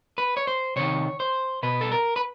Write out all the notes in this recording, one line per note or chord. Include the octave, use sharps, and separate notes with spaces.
B4
C#5
C5
C3 D#3 C#5
C5
B2 B4
A4
A#4
B4